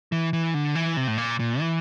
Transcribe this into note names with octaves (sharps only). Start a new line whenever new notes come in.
E3
E3
D3
E3
C3
A2
A#2
A#2
E3